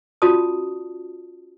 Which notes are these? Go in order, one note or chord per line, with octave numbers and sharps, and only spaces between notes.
C#4 F4 F#4 D5 A5 D#6